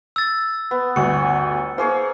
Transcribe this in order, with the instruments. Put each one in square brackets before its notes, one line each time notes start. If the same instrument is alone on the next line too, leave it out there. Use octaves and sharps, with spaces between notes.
[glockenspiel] E6 A6
[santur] B3
[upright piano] G1 D2 [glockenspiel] C#7
[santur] A#3 G#4 C#5 [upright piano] C5